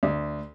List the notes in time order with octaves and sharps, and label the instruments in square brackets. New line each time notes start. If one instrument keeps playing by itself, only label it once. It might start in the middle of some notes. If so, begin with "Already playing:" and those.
[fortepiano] D2